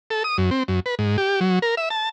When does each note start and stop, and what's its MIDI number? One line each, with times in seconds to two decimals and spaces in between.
0.10 0.23 69
0.24 0.37 87
0.38 0.50 42
0.51 0.63 60
0.68 0.80 42
0.86 0.95 71
0.99 1.17 44
1.18 1.40 67
1.41 1.59 54
1.62 1.75 70
1.77 1.89 76
1.90 2.09 81